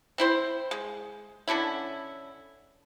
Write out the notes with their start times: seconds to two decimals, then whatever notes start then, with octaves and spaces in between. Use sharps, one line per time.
0.18 C4 E4 C5
0.71 G#3
1.48 D3 C#4 D4 E4